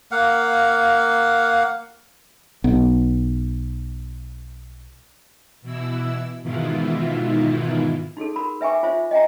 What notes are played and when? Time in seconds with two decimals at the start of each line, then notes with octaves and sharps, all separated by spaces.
0.12 A#3 F5 F#5
2.64 B1 B3
5.62 B2 E3 E4 E6
6.43 G#2 B2 D#3 E3 E4 F4
8.17 D#4 F#4 G#4 A4
8.36 F#4 A#4 B5
8.61 B4 E5 G5 G#5 C#6 D6
8.83 F4 C5 E5
9.11 D#5 G5 G#5 A#5